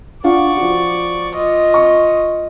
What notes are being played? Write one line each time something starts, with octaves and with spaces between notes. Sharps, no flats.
D4 F4 D5 F#5 C#6
F3 F#4
F4 D#5
C#6